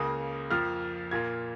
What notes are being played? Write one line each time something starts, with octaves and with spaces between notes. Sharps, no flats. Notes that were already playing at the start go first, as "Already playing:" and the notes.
Already playing: C#2 C#3 A#3 D#6
F2 F3 A#3 F6
A#2 A#3 F4 G#6